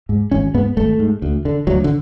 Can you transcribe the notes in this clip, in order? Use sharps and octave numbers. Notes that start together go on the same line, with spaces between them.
G#2
G#1 C#4
G#2 B3
G#1 A3
G#2
D2
D3
D2 F#3
D3